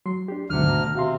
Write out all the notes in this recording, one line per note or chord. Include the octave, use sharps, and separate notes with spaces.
F#3 C6 C7
D4 G4
D2 G#2 B2 D3 D#3 F#3 F6
A#5
C3 F#4 F5 C6